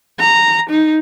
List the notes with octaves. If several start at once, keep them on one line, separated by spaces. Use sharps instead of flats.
A#5
D#4